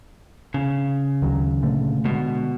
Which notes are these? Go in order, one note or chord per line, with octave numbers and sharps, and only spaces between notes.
C#3
D2 D#3 F#3
A#2 D3 A3
B2 D3 G#3